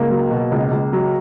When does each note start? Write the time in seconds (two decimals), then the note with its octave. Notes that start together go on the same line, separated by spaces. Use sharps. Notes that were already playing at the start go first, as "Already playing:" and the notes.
Already playing: C#2 A#3
0.10 F#3
0.31 B2
0.51 C#2
0.71 C#2
0.93 F#3